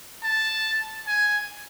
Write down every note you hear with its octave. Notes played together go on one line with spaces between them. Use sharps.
A5
G#5